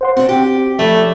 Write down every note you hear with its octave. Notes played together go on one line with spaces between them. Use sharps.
C5 F#5 C6
C4 D4 F#4
G4
F3 G3 A3 C#4